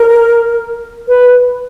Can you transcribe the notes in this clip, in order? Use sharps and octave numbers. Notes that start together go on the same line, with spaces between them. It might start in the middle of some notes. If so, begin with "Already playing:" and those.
Already playing: A#4
B4